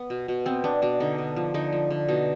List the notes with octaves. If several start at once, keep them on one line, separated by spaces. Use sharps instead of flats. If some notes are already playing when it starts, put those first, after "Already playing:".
Already playing: B3
B2
B2
B3 C4
B3 D4
B2 D4
D3 D#4
D3
F3
D3 D#4
F3
D3
B2 D#4